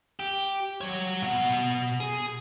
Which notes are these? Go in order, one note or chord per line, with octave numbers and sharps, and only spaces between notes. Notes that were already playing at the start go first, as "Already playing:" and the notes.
G4
F#3 C#5
B2 F#5
G#4